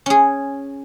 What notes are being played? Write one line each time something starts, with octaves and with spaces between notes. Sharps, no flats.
C#4 G#4